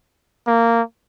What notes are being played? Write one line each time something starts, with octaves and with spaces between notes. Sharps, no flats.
A#3